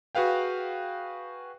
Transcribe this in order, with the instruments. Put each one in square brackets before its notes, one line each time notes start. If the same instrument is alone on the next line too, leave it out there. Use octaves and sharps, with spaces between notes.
[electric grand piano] F#4 G#4 B4 F5 G5